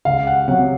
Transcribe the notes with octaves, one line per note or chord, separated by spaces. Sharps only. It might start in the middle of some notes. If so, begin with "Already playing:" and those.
C#2 F5
F#5
C3 F#3 F#5